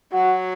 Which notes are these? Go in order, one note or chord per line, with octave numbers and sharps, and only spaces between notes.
F#3 F#4